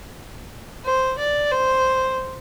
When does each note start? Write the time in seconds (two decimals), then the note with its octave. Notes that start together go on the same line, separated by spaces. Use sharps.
0.85 C5
1.18 D5
1.51 C5